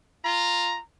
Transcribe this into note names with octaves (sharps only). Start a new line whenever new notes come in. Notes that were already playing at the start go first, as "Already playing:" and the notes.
F4 A#5